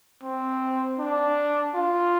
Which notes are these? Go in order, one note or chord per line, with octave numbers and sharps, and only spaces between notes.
C4
D4
F4